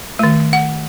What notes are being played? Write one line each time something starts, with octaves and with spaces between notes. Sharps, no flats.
D#3 A3
F#5